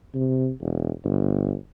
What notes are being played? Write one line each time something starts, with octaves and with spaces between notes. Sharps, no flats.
C3
E1
G1